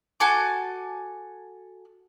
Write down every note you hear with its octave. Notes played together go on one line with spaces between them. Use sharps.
F#4 A4 G#5 D6